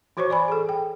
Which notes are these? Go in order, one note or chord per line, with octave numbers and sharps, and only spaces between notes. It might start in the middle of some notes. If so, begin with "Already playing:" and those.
E3 F#4 C5 C#5 C#6
D5 G#5 B5
G#4 A4
G5